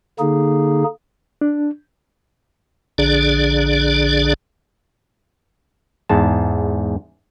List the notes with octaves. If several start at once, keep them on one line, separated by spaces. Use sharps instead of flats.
D3 A#3 D#4 G#4
D4
A#1 D3 D4 G#4 D5
E2 G#2 A5